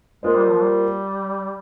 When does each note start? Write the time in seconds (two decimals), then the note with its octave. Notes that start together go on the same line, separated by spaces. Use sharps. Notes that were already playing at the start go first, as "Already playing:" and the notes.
0.23 G#3 A#3 F4 C5
0.35 G3
0.49 F3
0.60 G3